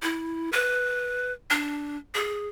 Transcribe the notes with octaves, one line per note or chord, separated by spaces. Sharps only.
E4
B4
D4
G#4